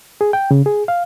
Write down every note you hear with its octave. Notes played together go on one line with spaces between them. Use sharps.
G#4
G5
C#3
G#4
F5